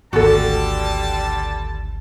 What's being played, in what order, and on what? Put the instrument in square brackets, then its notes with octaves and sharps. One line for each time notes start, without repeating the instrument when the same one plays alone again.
[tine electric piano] G#1 D2 [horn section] D3 G3 A5 [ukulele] F#4 A4